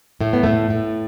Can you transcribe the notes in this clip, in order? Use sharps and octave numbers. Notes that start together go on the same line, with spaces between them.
A2 A3
B3
A2 A3
A2